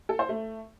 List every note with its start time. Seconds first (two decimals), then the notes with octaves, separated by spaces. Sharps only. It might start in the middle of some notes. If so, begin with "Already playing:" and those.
0.09 A4
0.19 C5
0.29 A3